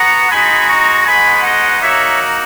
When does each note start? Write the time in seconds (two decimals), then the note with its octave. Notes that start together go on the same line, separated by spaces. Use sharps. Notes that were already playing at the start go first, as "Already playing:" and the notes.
Already playing: B3 F#4 F#5 A#5
0.31 G#3 D#4 F#4 G#5 B5
0.68 A#5 C#6
1.06 G#3 B3 D#4 F#4 G#5 B5
1.43 D#5 F#5
1.80 A#3 D#4 F#4 C#5 E5